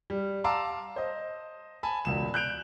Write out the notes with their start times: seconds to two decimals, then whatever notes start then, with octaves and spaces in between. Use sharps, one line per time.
0.10 G3
0.44 F5 A5 A#5 C6 D6 E6
0.96 C5 D#5
1.83 G#5 A5 B5
2.05 E1 C#2 E7
2.34 F#6 G6 D7 F7